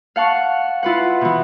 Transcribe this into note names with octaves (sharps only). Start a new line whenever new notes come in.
F5 F#5 A5 C#6
E4 F4 B4 F#5
B2 E3